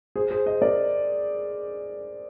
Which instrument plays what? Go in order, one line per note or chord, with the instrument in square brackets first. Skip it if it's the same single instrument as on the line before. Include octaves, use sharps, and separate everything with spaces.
[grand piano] G#4 C5
G#4 C5
C5 D#5
A#4 D5